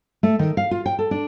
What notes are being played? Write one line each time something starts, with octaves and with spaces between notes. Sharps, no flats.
A3
D#3
F5
F4
G5
A4
D4